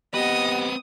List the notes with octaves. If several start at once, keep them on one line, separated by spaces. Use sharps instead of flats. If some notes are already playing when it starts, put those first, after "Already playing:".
B3 C4 G4 B4 D#5 F#5 D#6